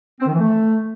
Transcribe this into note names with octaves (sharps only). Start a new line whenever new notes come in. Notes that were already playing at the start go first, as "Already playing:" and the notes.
C4
D#3
E3
A3